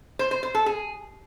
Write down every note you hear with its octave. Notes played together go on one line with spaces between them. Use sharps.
C5
C5
C5
A4
G#4